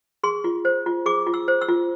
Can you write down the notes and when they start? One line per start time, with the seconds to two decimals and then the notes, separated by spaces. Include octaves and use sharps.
0.23 G#4 C6
0.44 F4
0.65 C5
0.86 F4
1.06 G#4 D6
1.27 F4
1.34 E6
1.48 C5
1.62 E6
1.68 F4